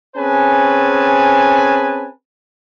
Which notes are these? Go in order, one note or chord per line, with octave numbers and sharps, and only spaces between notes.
C4 C#4 G#4 B4 G#5 A5